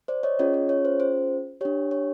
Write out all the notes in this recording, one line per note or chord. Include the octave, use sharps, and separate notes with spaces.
C5 D5
C#5 D#5
C#4 F4 G#4 C#5 D#5
C#5
C#5
C5
C5
D4 G4 C#5
C#5